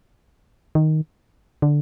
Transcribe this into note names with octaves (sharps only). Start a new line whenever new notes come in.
D#3
D3